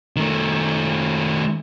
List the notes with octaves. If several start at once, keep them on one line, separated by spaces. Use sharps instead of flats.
D#3 A3